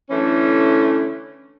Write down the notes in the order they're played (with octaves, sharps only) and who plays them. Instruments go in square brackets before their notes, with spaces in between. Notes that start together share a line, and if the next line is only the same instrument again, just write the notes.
[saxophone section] D3 E3 A3 C#4